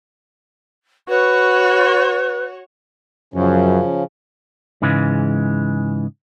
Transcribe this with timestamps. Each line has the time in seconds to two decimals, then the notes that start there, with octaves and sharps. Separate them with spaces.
1.08 F#4 B4 C#5
3.34 F#2 C#3 F3 C#4
4.82 G#2 C#3 E3 G#3